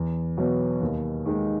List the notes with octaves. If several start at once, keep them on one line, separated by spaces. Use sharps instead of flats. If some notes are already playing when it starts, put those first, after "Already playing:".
Already playing: E2
B2 F#3 B3
D#2
D#3 G#3 D#4